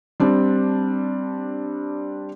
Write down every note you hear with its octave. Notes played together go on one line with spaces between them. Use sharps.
G3 C4 D4